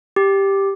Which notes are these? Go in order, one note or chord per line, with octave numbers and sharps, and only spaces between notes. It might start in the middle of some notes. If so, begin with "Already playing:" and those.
G4